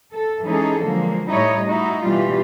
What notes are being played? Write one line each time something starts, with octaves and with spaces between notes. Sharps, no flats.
A4
E3 G#3 C#4 D#4 G#4 A4
D3 F3 F#3 G#3 A#3
A2 G3 D#4 E4 C#5 D#5
D#4 E4 F#4
B2 E3 G3 F4 G4